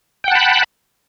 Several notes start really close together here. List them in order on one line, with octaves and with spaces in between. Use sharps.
G5 F#5 A5 B5